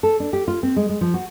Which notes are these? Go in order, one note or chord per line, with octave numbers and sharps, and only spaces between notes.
A4
D4
G4
F4
C4
G#3
G#3
F3
F#4